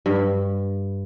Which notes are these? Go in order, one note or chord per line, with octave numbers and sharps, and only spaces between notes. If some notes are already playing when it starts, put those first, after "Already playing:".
G2